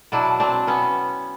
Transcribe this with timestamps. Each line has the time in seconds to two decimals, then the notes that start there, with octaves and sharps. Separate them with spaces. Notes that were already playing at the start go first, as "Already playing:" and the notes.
0.12 B2 F#3 D4 E4
0.40 C4 D4
0.67 B3 C#4